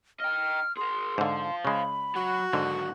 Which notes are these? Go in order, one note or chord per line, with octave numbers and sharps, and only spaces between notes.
D#5 G5 F6
G#4 A#4 C6
G#2 D3 C5 F5
C#3 G#3 B5
F#3 F#4
G#2 D3 D#3 F#3